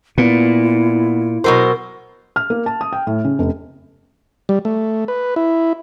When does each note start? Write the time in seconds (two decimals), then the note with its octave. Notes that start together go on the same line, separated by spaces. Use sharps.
0.18 A#2 B3 E4
1.44 B2 F#3 A#4 C5
2.36 F6
2.50 A#3
2.66 A5
2.81 D#6
2.93 G5
3.07 A2
3.25 C#3
3.39 F1
4.49 G3
4.65 A3
5.08 B4
5.36 E4